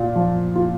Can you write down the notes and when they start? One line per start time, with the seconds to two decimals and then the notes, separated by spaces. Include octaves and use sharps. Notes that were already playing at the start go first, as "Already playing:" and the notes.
Already playing: A#2 F4
0.15 F3
0.56 F4